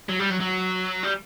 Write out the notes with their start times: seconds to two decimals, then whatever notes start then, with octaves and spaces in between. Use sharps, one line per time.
0.09 F#3
0.19 G3
0.30 F#3
0.40 F#3
1.03 G3